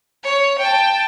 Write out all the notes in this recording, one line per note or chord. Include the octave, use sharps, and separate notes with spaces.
C#5
G5 A5